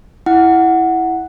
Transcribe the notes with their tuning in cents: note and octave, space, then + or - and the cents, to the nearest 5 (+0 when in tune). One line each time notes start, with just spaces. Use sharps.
E4 +0 F#5 +0